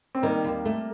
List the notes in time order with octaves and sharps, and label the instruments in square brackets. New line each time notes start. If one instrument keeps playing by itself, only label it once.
[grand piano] C4
[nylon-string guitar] D#3 [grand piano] G3 A#3
[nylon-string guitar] D#2
A3